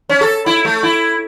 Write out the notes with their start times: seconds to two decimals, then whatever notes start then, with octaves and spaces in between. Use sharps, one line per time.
0.09 C#4
0.21 A4
0.46 E4
0.65 A3
0.83 E4